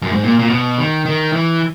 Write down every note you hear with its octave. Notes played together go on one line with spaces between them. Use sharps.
F#2
G#2
A#2
A#2
B2
D#3
D#3
E3